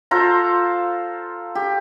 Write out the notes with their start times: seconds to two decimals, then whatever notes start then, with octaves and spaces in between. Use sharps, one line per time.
0.11 F4 A4 C5 A#5
1.55 G4